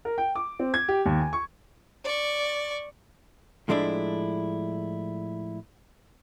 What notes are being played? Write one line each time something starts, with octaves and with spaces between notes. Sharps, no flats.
A#4
G5
D6
C4
G#6
G4
D#2
G#5
C#6
D5 C#6
A2 F3 G#3 A3 D4 E4